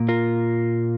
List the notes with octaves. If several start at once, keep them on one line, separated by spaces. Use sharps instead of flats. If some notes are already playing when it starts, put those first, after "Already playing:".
Already playing: A#2 A#3
F4 A#4